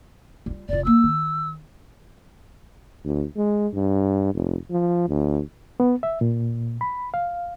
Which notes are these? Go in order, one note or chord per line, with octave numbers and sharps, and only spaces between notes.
G3 F4
F1 F4 D5
G3 A#3 E6
D#3
D2
G#3
G2
F1
F3
D2
B3
E5
A#2
B5
F5